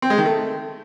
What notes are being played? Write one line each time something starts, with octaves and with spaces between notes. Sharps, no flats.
C4
G#3
D#3
A3